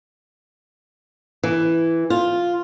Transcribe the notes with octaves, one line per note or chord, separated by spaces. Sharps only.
E3
F4